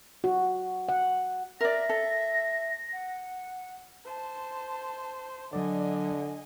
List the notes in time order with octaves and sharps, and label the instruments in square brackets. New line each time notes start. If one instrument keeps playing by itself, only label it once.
[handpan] F#4
F#5
[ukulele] A#4 D5 [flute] E5 [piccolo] A#6
[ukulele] A4
[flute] F#5
[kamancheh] C5 A5
[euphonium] D3 [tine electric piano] F#3 D5 [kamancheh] D#5 G#5